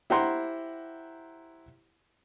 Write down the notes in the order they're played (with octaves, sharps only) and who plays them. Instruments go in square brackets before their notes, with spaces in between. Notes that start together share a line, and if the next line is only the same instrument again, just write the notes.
[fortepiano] E4 G4 C5 F#5 A#5 C6